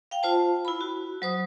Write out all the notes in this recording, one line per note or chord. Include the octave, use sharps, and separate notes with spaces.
F5 G5
F4 C5 A5
E4 B5
F#4
F#3 C5 D#6